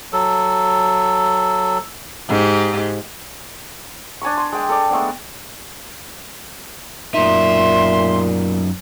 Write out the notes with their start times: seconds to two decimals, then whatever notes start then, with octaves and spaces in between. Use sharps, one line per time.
0.13 F#3 A4
2.29 G#2 G4
4.22 D4 G#5 A#5 C#6
4.37 C6
4.52 G#3 G5
4.69 A4 D5
4.90 G#3 A3 B3 D4
7.14 F#2 A#2 D#4 E5 C6